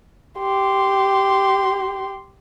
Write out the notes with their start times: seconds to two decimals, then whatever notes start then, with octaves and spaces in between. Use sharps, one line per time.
0.39 G4 C6